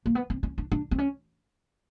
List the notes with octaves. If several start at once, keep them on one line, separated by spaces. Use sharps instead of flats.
A#3
B3
C4
C#4
D4
D4
C4
C#4